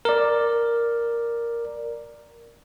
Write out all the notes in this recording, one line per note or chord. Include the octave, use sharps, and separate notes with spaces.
A#4 D5